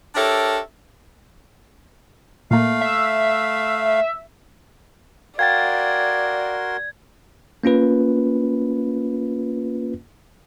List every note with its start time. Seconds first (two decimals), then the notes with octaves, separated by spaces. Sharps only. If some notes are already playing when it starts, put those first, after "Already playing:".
0.15 D4 G4 A4 A#4 C#5 E5
2.51 A#2 A3 A#3 F5
2.81 E5
5.39 F#4 A#4 D5 F5 G5 C6 G#6 A6
7.64 A#3 C#4 F4 B4